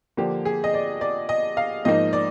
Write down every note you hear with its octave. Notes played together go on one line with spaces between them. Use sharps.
D3 F3 A#3 G4
G#4
D#5
D5
D5
D#5
F5
G#2 F3 A#3 D#4 D#5
D5